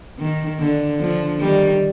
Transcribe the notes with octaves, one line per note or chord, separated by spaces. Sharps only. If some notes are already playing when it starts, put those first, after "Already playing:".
D#3
D3
D3 F3
D#3 G3